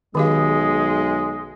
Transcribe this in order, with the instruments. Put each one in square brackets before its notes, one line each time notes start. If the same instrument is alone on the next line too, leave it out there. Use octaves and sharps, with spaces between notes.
[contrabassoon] B1 [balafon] D#3 G4 F5 [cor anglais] G#3 [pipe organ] G#4